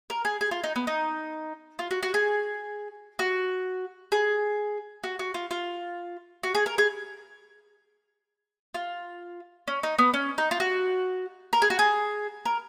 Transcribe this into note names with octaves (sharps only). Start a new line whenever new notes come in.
A#4
G#4
G#4
F4
D#4
B3
D#4
F4
F#4
F#4
G#4
F#4
G#4
F#4
F#4
F4
F4
F#4
G#4
A#4
G#4
F4
C#4
D#4
B3
C#4
D#4
F4
F#4
A#4
G#4
F#4
G#4
A#4